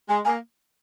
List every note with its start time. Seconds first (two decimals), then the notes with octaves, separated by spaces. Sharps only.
0.09 G#3 G#5
0.25 A#3 G#5